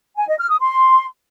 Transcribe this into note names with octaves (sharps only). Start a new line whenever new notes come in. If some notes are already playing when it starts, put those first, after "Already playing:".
G#5
D#5
F6
D#6
C6